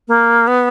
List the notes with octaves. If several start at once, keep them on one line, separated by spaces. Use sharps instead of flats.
A#3
B3